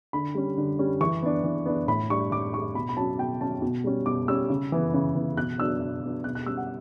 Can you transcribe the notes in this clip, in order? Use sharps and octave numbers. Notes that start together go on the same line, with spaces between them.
D3 B5
G3 C#4
D3
G3 C#4
E3 C#6
B3 D4
E3
B3 D4
A2 B5
G3 D4 C#6
A2 D6
G3 D4 C#6
B2 B5
B5
F#3 C#4 A5
B2 G5
F#3 C#4 A5
B2
G3 C#4
B2 D6
G3 C#4 E6
C#3
E3 B3
C#3
E3 B3
B2 F#6
F#3 B3 D4 E6
B2
F#3 B3 D4
B2 F#6
F#6
G3 C#4 E6
F#5